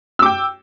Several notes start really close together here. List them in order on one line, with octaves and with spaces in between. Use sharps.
E6 D6 G5